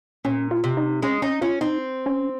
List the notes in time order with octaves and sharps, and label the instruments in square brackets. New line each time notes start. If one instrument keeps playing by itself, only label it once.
[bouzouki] A#2 [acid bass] C#4
[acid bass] F4
[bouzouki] C3
[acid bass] D#4
[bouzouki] G#3 [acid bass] C#4
[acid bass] C#4 [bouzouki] D#4
[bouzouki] C#4 [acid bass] F4
[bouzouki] C4 [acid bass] D#4
[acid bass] C#4